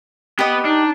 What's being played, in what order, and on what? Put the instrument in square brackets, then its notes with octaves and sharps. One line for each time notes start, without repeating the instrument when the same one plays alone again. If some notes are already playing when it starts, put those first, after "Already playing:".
[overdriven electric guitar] B3 B4 [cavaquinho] G4 D#5
[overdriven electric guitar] D4 [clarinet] D#4